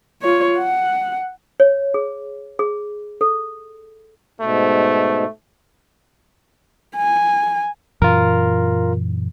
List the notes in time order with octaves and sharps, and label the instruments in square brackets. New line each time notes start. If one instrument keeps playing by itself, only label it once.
[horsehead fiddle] F4 C#5
F#5
[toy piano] C#5
G#4
G#4
A4
[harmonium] G#2 B2 [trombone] A3
[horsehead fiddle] G#5
[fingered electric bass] F#2 A#2 E3 [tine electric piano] F4 A#4